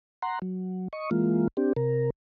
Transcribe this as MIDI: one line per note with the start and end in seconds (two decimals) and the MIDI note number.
0.22 0.39 78
0.22 0.39 82
0.22 0.39 84
0.42 0.88 54
0.93 1.10 75
0.93 1.10 85
1.11 1.48 52
1.11 1.48 56
1.11 1.48 58
1.11 1.48 65
1.57 1.73 60
1.57 1.73 62
1.57 1.73 67
1.77 2.10 48
1.77 2.10 70